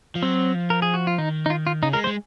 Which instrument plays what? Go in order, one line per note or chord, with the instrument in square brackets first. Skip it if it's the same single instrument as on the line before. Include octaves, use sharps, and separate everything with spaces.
[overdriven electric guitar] F3
[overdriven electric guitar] F#3 [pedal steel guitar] C4
[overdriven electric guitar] F3
[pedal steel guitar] A#4
G#4
F#4
F4
[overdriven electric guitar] D#3 [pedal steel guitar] D#4
[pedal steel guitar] D#4
F4
F4
[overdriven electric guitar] C#3 [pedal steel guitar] D#4
[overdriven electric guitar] G#3 [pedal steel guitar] A#4
[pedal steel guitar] C5
[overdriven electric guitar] G#3